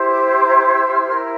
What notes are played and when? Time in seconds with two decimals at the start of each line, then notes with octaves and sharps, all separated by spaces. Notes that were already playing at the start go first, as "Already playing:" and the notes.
Already playing: E4 G4 C5
0.13 D6
0.28 C6
0.45 A#5
0.77 E6
0.93 F6
1.08 E4 A#4 F6